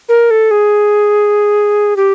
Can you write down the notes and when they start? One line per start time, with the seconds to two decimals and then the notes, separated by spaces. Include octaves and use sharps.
0.09 A#4
0.31 A4
0.51 G#4
1.97 G4